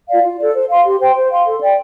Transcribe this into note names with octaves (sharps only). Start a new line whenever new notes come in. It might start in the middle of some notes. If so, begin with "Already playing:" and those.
F4 D5 F5
F4
A4 D5
C5
F5 C6
G4
C5 G5 C6
C5
F5 C6
A4
D5 G5